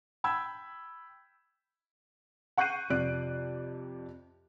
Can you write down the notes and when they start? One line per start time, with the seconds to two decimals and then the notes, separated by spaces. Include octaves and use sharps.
0.24 G5 B5 E6 G#6
2.58 F#5 C#6 F#6 G6 C7 D#7
2.90 F2 C3 D5 F#6 D7